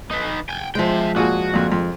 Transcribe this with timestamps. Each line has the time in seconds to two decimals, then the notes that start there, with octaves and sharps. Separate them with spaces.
0.11 D#4 B4
0.49 G5 G#5
0.75 F3 G#3 E5 G5
1.16 A#2 F#4 G#4
1.53 F2 A#2
1.72 F2